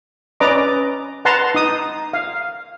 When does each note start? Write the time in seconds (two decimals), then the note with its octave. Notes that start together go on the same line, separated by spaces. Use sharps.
0.40 C#4 B4 D5 D#5 A#5 D6
1.25 B4 F#5 A5 A#5 C6
1.55 D#4 D#6
2.13 F5